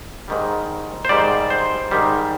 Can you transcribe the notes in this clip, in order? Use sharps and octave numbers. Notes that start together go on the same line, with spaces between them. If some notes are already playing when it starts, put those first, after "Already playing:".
G#2 D#3 G3
C5
G#2 D#3 G3 D5
C5
G#2 D#3 G3